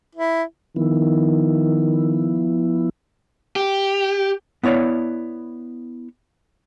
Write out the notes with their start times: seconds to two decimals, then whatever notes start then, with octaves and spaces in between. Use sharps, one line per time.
0.15 E4
0.76 D#3 F3 B3 E4
3.56 G4
4.63 B3 E4 C#5 D5 F5